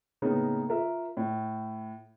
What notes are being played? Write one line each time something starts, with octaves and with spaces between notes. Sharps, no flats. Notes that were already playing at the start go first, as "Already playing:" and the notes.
A2 C#3 A#3 B3 D#4
F4 A#4 E5
A2